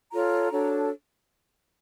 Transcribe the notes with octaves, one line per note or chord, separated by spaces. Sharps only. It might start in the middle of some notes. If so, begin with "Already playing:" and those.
F4 A4 C#5 A#5
D4 F#4 A4 C#5